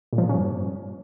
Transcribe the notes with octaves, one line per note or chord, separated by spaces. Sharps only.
A#2
F3
A#2
C#4
G2